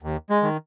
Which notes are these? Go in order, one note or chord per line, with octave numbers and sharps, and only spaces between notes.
D#2
G#3
D#3